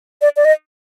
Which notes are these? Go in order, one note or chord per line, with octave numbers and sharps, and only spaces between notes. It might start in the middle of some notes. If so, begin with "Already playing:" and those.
D5
D5
D#5